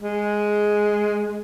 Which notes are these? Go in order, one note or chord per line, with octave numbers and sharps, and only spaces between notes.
G#3